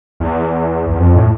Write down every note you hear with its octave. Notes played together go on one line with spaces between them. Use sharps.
E2
E2
F2
A2